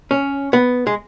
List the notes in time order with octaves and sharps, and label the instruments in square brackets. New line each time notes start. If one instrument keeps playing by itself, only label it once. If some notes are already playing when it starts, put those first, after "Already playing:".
[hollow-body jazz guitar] C#4
B3
G#3